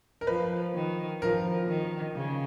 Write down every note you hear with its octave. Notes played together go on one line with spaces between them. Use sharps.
A#4
F3 B4
D#3
F3 A#4
D#3
C#3